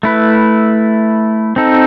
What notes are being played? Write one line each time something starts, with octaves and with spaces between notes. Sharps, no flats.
A3 E4 B4
C4 D#4 A4